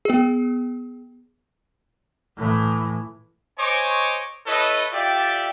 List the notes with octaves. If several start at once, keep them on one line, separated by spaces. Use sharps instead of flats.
B3 G#4
A2 E3
C5 C#5 D#5 G#5 C#6 D6
E4 A4 B4 C#5 D#5
F4 G4 A4 D5 E5 G5